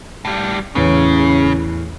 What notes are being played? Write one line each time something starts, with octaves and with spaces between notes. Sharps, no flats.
A2 G3
E2 A2 C#3 C#4 C#5